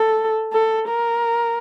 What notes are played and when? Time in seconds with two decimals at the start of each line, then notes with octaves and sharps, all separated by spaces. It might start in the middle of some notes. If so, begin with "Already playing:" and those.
Already playing: A4
0.53 A4
0.89 A#4